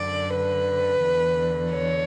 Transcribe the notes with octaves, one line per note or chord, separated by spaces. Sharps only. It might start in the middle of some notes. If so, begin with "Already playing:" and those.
Already playing: F#2 D3 D5
B4
E2 D3
C#5